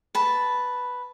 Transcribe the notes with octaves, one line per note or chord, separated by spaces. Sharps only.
B4 A5